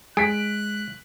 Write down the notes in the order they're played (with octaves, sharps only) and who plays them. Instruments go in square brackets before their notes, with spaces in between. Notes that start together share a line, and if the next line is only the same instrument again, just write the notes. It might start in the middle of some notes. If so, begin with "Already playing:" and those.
[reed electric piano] G#3 [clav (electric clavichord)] G#4 [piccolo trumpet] F#6 [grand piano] B6 D7